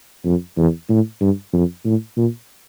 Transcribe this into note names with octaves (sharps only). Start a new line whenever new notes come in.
F2
E2
A2
G2
F2
A2
A#2